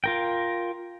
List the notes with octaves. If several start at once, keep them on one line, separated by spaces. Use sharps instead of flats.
F4 A#4 G5